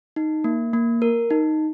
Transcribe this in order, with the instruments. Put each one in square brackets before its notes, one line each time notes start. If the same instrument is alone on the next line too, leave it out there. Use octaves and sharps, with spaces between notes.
[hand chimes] D#4
A#3
A#3
A#4
D#4